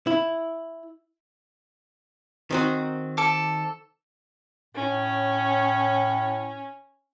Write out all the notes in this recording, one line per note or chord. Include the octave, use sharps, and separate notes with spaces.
E4
D#3 C4 F#4
A4 D6
A2 C#4